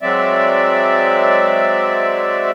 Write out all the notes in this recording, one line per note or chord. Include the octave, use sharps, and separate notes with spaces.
F#3 G#3 C4 D5 E5